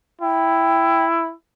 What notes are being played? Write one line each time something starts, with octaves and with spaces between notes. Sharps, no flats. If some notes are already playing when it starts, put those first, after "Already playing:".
E4 G5